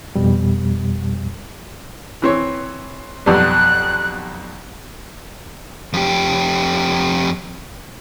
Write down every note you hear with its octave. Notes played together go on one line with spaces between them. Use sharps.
F2 B2 G3
E3 C4 C#5
B1 F2 G3 F#6
F2 G4